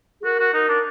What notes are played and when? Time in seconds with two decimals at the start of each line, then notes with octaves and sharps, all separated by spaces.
0.21 G#4
0.25 F#4 A#4
0.40 F#4
0.54 D#4 A#4
0.68 D4